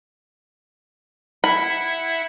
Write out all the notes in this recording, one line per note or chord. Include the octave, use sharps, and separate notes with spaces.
E4 E5 F#5 B5